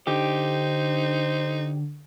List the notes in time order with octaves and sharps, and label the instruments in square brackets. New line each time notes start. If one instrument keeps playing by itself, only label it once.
[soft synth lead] D3 [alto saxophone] D#4 [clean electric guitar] G4 [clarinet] C5